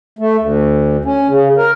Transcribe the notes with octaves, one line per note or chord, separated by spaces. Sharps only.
A3
D2
C#4
C#3
A#4